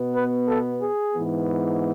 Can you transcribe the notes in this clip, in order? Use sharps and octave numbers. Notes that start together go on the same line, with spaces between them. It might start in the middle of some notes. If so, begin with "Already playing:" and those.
Already playing: B2 B3
B4
A4
G#4
G#2 E3 B3